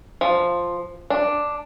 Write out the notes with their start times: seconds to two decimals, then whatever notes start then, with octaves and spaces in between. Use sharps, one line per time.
0.21 F3
1.10 D4